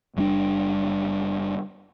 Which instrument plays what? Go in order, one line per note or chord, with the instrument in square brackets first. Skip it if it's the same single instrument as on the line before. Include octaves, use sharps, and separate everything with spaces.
[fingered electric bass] F#1 G3 C4 D4